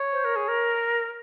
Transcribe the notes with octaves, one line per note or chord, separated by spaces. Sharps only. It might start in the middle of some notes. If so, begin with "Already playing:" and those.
Already playing: C#5
C5
A#4
G#4
A#4